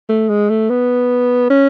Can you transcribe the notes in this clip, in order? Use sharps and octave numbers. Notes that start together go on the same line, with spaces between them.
A3
G#3
A3
B3
C#4